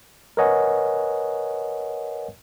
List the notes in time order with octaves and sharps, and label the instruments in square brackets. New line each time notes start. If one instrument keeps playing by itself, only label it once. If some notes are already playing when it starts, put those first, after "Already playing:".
[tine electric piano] A#4 B4 C#5 D#5 F#5 G#5